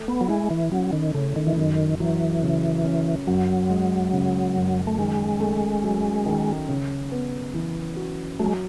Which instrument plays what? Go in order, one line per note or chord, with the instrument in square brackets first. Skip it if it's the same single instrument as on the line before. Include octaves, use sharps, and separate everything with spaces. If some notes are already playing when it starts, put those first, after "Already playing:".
Already playing: [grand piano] A3
[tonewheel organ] B3
F#3
[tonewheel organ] G#3 [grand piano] E4
[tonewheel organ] E3
[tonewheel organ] F#3 [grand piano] C#4
[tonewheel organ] D#3
[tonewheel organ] C#3 [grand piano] A3
[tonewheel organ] D#3
E3
[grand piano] F#2 [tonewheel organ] D#3
[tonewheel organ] E3 [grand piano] F#3
[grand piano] C#3
C#4
[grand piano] F#2 [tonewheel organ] F#3
[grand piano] G#3
C#3
F#2
[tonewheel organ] A3
[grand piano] D#3 [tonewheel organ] G#3
[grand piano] A3
F#3
D#3
C#3
B3
E3
F#4
[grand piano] F#3 [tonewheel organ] A3
[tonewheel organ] G#3